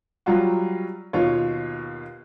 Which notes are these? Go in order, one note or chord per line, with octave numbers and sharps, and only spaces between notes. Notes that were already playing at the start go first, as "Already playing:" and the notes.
F#3 G3 F4 F#4
D#2 B2 F4 C#5